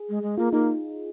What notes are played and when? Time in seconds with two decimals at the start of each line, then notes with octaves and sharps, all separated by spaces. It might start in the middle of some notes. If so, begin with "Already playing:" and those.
Already playing: G#4
0.09 G#3
0.23 G#3
0.38 A#3 F4
0.53 A#3 D#4